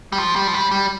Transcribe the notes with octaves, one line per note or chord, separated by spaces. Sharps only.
G3
F3
G3
F3
G3
G3